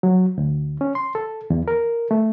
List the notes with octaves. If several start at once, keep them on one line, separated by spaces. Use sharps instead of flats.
F#3
D2
C#4
C6
A4
E2
A#4
A3